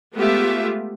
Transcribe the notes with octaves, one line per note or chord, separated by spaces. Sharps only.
G#3 A3 B3 F4 G4 E5